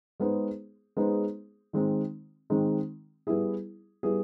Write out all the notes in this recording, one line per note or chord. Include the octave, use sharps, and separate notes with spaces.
G#3 B3 D#4 G#4 C5
G#3 B3 D#4 G#4 C5
D#3 G#3 C4 D#4
D#3 G#3 C4 D#4
G3 B3 E4 G#4
G3 B3 E4 G#4